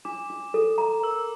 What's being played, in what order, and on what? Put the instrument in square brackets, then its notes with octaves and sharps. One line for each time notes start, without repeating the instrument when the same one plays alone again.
[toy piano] D4 [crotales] D6
[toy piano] D4
A4
A#5
[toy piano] A#4 [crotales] E6